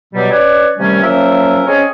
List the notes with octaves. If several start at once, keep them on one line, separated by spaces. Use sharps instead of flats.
B2 F#3 G3
C#4 B4 C#5 D5
C3 D#3 G3 A3 C#4
F3 F#3 A#3 C#4 A#4 E5
C4 C#4 G#4 C#5 D#5 G#5